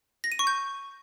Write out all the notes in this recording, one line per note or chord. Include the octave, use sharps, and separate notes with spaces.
A#6
D#7
C#6
G6